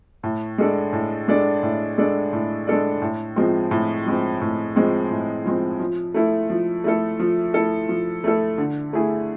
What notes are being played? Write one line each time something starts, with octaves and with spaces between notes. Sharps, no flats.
A2
G#3 D4 A4 D5
A2
G#3 D4 A4 D5
A2
G#3 D4 A4 D5
A2
G#3 D4 A4 D5
A2
F3 G#3 C4
A2
F3 G#3 C4
A2
F3 G#3 C4
A2
F3 G#3 C4
F3
A3 E4 A4
F3
A3 E4 A4
F3
A3 E4 A4
F3
A3 E4 A4
D3
A3 E4 G#4